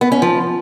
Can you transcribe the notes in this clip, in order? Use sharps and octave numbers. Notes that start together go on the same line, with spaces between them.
B3
C#4
F3